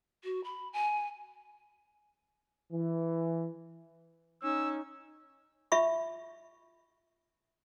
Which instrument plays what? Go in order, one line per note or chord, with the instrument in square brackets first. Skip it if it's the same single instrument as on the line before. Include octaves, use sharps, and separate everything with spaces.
[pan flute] F#4
B5
G#5
[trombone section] E3
[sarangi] C#4 [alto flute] D#4 [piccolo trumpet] E6
[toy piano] F4 E5 B5 C#6